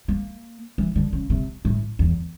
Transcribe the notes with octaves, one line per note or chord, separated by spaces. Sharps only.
A#3
E3
D3
C#3
C3
A2
E2